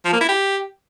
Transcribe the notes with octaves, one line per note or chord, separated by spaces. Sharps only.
F3
A#3
E4
G4